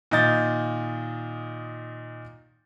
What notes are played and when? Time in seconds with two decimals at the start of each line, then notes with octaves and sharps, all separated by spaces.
0.11 A#2 D#3 D#5 G6 A6